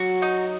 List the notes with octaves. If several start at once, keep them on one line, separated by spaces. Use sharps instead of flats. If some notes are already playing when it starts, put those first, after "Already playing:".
Already playing: F#3 F#4
D#4